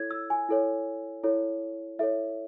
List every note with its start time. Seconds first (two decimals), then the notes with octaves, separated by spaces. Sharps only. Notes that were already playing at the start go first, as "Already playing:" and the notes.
Already playing: E4 A4 C#5 G#6
0.11 E6
0.30 G#5
0.49 E4 A4 C#5
1.24 E4 A4 C#5
1.99 E4 A4 C#5 E5